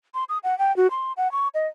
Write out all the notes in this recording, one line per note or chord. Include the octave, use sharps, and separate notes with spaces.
C6
D#6
F#5
G5
F#4
C6
F#5
C#6
D#5